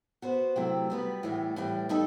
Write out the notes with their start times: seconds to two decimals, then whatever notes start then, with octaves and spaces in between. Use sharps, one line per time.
0.22 B3 F#4 C5
0.56 C3 F#3 A3 E4 G4
0.90 G3 B3 F#4 B4
1.23 A2 E3 G3 B3
1.56 A2 E3 G3
1.89 G3 D#4 A4